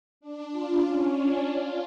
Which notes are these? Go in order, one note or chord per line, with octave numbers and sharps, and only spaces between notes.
D4
F4
C#4
D4
F4